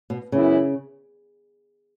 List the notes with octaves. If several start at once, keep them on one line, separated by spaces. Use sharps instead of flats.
B2
F#2 C#3 E3 B3 E4